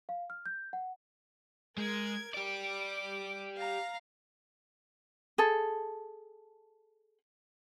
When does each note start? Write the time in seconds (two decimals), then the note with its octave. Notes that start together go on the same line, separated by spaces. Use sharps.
0.09 F5
0.30 F6
0.46 G6
0.73 F#5
1.78 G#3 A#4 G#6
2.34 G4 D5 D6
3.57 F5 A#5
5.38 G#4 A4